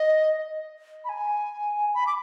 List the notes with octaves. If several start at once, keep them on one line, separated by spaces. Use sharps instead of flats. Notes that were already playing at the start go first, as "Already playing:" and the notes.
Already playing: D#5
B5
G#5
B5
D6